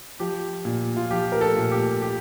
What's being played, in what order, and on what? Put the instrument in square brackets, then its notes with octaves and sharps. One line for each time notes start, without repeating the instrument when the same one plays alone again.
[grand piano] F3 G4
A#2
F4
F3 G4
A#4
A4
A#2
G4
G4